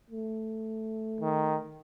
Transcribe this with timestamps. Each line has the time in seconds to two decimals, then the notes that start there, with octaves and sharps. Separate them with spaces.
0.11 A3
1.20 D#3